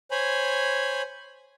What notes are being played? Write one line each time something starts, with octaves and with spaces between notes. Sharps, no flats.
C5 C#5 G#5 B5